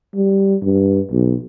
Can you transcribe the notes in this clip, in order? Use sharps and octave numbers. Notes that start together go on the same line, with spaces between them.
G3
G2
B1